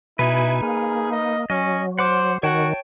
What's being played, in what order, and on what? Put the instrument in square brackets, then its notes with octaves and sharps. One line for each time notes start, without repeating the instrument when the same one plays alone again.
[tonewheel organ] B2 G#5 [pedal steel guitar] D#4 B4 [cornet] E4
[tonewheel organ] A#3 [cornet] G#4
[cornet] D#5
[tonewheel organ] F#3 [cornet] C#4 [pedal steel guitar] D#5
[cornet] C5 [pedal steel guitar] F#5 D6
[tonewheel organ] D#3 [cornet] F#4 [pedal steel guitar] C#5 G5 A5